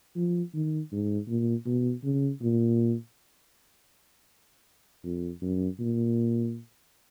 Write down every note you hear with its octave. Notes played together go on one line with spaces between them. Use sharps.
F3
D#3
G#2
A#2
B2
C#3
A#2
F2
F#2
A#2